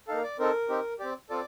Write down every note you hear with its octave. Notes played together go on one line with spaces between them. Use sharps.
A#3 D#4 A4 F5
D5
C4 D#4 A4 A#4
C4 D#4 G4
C4 G4 D5
C4 F4 A4 D5